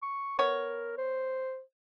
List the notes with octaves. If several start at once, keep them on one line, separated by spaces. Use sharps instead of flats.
C#6
B3 A#4 C#5
C5